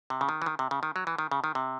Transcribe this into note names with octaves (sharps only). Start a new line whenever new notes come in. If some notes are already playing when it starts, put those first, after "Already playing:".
C3
C#3
D#3
E3
D#3
C3
C#3
D#3
F#3
E3
D#3
C#3
D#3
C3